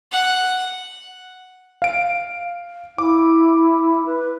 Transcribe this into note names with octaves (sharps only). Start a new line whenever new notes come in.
F#5
F5 D7
E4 D6
B4